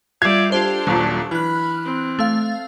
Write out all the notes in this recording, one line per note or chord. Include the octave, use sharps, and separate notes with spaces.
G3 F4 D5 E5 G#6
D4 F4 G4 A4 C5
D#1 A#2 F#3
E3 B5 F6 F#6
C4
A3 F5